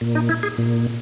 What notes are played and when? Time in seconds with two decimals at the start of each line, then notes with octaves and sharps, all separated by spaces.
0.01 A#2
0.15 D#4
0.29 E4
0.43 G#4
0.58 A#2